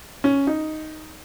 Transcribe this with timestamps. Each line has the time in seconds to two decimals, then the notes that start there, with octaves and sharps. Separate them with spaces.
0.24 C#4
0.47 D#4